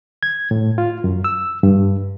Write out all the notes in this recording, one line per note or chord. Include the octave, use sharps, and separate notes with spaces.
G#6
A2
F4
F#2
E6
G2